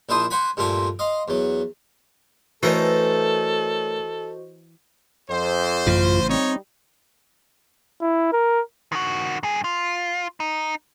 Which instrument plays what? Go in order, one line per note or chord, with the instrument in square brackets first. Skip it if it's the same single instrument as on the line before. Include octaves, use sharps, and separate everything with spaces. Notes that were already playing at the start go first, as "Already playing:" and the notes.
[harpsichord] A#1 D4 E4 C5 D#6
C5 F#5 G#5 B5
G2 A#2 A3 C4 A#4 G#5
D#5 F5 C6
E2 F#3
[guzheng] E3 [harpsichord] A3 C#4 A#4 [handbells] F#4 C5 D#5 [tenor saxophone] A4
[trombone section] F2 [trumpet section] C5
[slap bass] A1 C#3 [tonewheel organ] F#2 F4
[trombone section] G3 [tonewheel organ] C4 [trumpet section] D#4 C#5
[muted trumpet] E4
A#4
[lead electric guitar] D#3 F#4
G2 G#4
F4
D#4